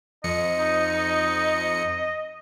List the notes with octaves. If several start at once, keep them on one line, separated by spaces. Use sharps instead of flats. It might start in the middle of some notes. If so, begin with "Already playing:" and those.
F2 D#5 C#7
D#4